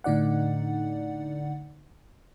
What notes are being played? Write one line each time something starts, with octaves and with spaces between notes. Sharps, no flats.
A2 D3 D#4 D5 F#5